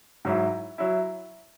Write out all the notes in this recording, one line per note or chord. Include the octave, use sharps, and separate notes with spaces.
G#2 F#3 E4
F#3 E4